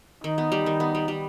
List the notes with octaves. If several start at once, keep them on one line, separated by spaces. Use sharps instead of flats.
D#3 D#4
B3
G3
D#3
B3
G3
G3